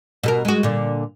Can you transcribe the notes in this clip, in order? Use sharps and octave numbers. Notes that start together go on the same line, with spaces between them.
B2 A4 A#4
G#3 F#4
A#2 D3